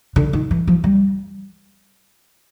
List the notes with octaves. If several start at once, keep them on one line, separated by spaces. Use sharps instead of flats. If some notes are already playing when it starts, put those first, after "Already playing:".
D3
D#3
E3
F3
G3